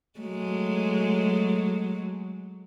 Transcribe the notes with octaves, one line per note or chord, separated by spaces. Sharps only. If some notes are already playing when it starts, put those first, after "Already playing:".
F#3 G#3 A3